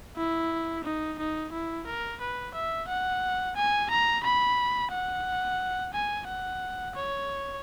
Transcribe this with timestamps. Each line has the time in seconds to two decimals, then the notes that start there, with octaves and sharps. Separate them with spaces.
0.17 E4
0.84 D#4
1.19 D#4
1.52 E4
1.86 A#4
2.21 B4
2.54 E5
2.88 F#5
3.56 G#5
3.90 A#5
4.23 B5
4.92 F#5
5.94 G#5
6.28 F#5
6.96 C#5